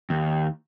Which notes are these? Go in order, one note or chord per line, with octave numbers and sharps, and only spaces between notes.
D#2